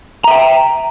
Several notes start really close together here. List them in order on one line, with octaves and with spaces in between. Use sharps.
A#5 E5 G5